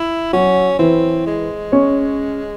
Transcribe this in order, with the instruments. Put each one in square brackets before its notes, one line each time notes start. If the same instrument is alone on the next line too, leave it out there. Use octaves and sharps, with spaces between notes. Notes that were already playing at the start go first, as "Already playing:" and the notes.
Already playing: [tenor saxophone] E4
[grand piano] F#3 F#4 [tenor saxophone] C#4
[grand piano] E3 E4 [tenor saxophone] C4
[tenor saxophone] G#3
[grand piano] C#4 C#5